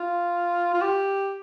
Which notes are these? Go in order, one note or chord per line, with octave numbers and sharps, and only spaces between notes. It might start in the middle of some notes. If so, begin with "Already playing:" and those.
Already playing: F4
F4
G4